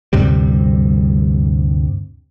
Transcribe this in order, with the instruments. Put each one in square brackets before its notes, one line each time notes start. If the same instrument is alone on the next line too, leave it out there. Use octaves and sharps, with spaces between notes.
[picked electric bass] D2 G2 C3 G3